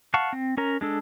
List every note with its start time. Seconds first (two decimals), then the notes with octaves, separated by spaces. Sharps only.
0.14 F5 F#5 A5 C#6
0.33 C4
0.57 C#4 A#4 A#5
0.81 G#3 D4 A4